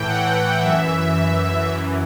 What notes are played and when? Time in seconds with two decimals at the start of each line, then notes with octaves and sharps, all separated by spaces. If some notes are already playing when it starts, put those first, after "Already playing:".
Already playing: A2 E3 G5
0.08 F#5
0.62 F#2 E3 E5
1.71 F#2 E3